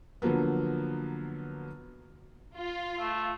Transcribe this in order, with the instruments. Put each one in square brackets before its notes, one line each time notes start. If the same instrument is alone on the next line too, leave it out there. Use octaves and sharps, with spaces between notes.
[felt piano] D3 F3 F#3 A#3 B3
[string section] F4
[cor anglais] A3